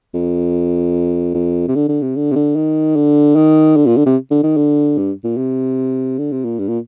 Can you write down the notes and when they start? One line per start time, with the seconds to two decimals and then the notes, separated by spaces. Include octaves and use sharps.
0.14 F2
1.34 F2
1.68 C3
1.75 D3
1.88 D3
2.02 C3
2.16 D3
2.31 C3
2.36 D3
2.56 D#3
2.96 D3
3.36 D#3
3.76 D3
3.86 A#2
3.97 D3
4.06 C3
4.31 D3
4.43 D#3
4.57 D3
4.98 G2
5.24 A#2
5.37 C3
6.18 D3
6.31 C3
6.45 A#2
6.59 G2
6.68 A#2